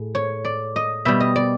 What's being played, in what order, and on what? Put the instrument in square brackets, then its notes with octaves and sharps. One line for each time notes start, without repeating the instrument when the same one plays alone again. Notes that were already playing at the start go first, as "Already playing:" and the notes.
Already playing: [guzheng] A2 G#4
C#5
D5
D#5
B2 G3 E5
D#5
D5